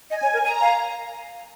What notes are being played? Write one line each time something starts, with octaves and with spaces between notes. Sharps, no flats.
D#5 G#5
C#5
A#4
G#5 A#5
F5